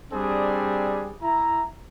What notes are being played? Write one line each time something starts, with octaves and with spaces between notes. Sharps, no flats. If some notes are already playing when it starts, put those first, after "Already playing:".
G3 C4 D4 G#4
E4 A#5